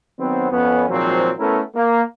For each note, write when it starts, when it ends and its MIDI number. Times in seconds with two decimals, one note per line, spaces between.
0.19 0.51 51
0.19 0.51 54
0.19 0.51 59
0.19 0.51 60
0.51 0.85 41
0.51 0.85 59
0.51 0.85 61
0.89 1.32 32
0.89 1.32 46
0.89 1.32 53
0.89 1.32 54
0.89 1.32 60
0.89 1.32 72
1.39 1.61 57
1.39 1.61 59
1.39 1.61 61
1.39 1.61 64
1.39 1.61 69
1.39 1.61 70
1.75 2.03 58